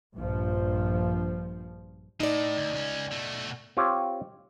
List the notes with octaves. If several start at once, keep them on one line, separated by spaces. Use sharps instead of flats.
A#1 G2 F3
A2 D#4 D5
D2
C#2 C#4
B2 A3
C4 F4 G4 C#5